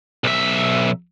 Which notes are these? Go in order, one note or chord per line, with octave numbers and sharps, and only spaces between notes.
B1 E5